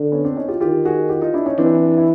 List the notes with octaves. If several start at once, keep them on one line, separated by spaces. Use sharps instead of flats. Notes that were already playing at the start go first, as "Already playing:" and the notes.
Already playing: D3
B3 C#4
C4 D4
C#4 D#4
F4 G4
D#3 F4 G4
F#4 G#4
F4 G4
D#4 F4
D4 E4
C#4 D#4
E3 C4 D4
E4